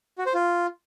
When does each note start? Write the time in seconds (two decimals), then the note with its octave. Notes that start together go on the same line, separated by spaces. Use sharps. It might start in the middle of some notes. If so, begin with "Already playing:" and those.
0.18 F#4
0.26 C5
0.34 F4